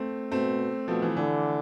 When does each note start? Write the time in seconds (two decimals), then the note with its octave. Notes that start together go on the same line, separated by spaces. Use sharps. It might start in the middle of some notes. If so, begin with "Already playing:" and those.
Already playing: A3 C4
0.31 B2 A3 C4
0.88 B2 F3 A3
1.02 E3
1.16 D3 E3